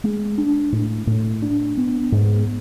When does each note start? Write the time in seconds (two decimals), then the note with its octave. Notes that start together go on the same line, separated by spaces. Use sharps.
0.04 G#3
0.38 D4
0.72 A2
1.07 A2
1.42 D4
1.77 B3
2.12 G#2